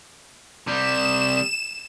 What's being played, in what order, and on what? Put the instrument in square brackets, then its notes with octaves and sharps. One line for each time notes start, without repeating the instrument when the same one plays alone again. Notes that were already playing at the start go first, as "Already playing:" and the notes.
[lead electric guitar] C3 G3 [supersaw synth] E7